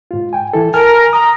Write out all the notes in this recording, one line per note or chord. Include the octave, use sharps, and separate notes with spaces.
G#2 F4
G5 G#5
E3 E4 A4
A#4 G#5 A5 F6
A#5 D#6